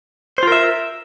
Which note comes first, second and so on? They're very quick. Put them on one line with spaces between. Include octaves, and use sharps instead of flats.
C5 F4 A#4 E5